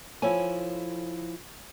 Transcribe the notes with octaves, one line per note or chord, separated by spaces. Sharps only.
F3 E4 A4 C#5 G#5